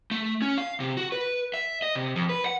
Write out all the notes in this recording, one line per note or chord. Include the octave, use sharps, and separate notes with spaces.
A3
C#4
F5
C3
F#4
B4
E5
D#5
C3
F2
B4
F#5